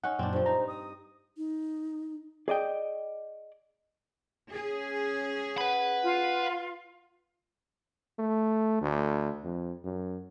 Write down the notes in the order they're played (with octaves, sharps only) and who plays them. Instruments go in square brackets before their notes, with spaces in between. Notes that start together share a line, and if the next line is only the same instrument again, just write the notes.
[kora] C#4 D#4 [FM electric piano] F#5
[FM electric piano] F#2 A#2 [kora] C4 D4
[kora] G2 F3 [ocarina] C5
[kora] D#4 [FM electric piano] A#5
[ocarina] D#6
D#4
[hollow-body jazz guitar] G#4 D5 D#5 G5
[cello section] C#4 G#4
[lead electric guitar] B4 B5 [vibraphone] F#5
[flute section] F4
[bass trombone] A3
D2
F2
F#2